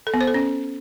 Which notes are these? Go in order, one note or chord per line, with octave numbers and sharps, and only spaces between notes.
A4
B3
C5
A4
C#4